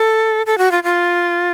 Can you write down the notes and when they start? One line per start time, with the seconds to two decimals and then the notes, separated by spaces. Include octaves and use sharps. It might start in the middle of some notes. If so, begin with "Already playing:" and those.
Already playing: A4
0.46 A4
0.58 F#4
0.71 F4
0.84 F4